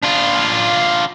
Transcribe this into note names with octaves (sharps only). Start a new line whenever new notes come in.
D4 F4